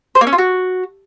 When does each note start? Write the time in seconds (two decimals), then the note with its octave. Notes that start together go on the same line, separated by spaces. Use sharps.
0.15 C5
0.21 A#3
0.27 C#4
0.33 F4
0.38 F#4